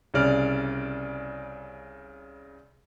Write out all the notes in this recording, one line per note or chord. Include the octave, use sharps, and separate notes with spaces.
C2 C#3 D5 F6